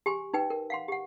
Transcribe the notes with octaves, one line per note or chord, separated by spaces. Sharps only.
G4 G#5 C6
D#4 B4 G5
A#4
F5 F#5 C6
G4 F#5